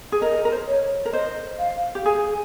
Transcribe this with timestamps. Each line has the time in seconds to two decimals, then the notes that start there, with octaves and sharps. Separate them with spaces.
0.12 G#4
0.22 A#4 D#5
0.45 A#4
0.52 C5
0.67 C#5
1.05 A#4
1.13 C5 D#5
1.59 F5
1.95 G4
2.06 G#4 G#5